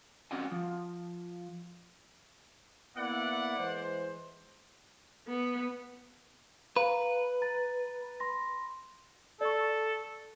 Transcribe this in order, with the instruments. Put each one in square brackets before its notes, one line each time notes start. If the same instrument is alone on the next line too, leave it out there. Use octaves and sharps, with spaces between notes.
[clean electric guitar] C4 C#4 F#4 D#5 F#5 G#5
F3
[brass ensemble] A#3 B3 E4 [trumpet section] D5 F#5
[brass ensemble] E3 G#3 C5
[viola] B3
[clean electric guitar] B4 [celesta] F5 A#5
[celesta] A#5 A6
B5 C6 A#6
[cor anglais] A4 [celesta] D5 C#6